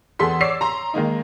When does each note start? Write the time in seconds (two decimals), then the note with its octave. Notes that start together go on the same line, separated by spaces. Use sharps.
0.19 E2 G#4 A4 C6 B6
0.40 C#5 D5 D6 E6 C7
0.61 A#5 C6
0.94 D#3 G#3 A#3 D#4